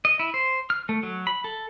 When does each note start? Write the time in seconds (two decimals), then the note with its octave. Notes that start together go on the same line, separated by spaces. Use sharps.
0.05 D#5
0.19 E4
0.34 C5
0.70 F6
0.89 A3
1.03 F#3
1.27 B5
1.44 A4